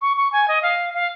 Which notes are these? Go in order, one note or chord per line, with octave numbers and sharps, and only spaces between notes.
C#6
C#6
G#5
D#5
F5
F5